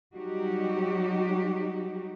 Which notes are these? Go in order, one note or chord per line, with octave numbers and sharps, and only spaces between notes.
F#3 G3 D#4 F#4 G4